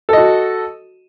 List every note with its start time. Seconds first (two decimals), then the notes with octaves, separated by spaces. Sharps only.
0.09 A4
0.13 D#5
0.17 F#4